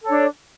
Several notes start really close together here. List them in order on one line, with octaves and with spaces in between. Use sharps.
A4 C#5 D4